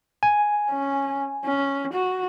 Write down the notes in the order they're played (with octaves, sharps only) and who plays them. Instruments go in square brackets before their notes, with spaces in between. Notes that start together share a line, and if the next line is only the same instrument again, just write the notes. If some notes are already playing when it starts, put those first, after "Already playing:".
[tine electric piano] G#5
[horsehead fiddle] C#4
C#4
F#4